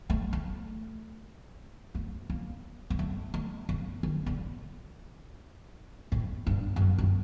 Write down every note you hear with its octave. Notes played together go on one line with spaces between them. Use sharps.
A3
A3
A3
A#3
G#3
A3
A3
A3
D#3
D3
A2
G2
G2
F#2
F#2